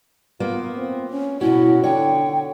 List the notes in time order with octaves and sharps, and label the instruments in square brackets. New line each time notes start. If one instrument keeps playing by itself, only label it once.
[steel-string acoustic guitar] A#3 B3 [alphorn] F4
[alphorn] C4
C#4
[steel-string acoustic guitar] B2 C#4 [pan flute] E4 [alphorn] F#4
[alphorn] D3 [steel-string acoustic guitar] C#5 [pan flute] G5